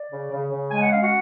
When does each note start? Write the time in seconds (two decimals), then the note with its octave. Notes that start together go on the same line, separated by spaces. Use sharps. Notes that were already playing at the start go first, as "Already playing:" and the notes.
Already playing: D5
0.12 C#3
0.32 C#3
0.52 C#3
0.71 G#3 G#5
0.82 F#5
0.91 C#4 F5
1.03 F#4 F#5